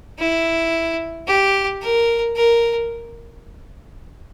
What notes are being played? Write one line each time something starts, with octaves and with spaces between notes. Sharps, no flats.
E4
G4
A#4
A#4